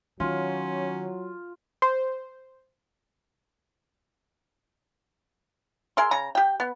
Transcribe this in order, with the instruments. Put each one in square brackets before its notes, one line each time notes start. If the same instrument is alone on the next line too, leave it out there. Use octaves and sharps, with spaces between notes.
[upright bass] D#3 [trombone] F#3 [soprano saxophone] C#4 [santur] F4
[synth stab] C5
[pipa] G#4 A#4 E5 C6
C#3 A#5
G4 G5
B3